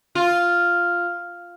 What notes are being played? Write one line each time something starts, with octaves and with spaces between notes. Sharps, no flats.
F4